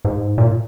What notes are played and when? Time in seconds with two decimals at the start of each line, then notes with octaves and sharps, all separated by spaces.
0.05 G#2
0.38 A#2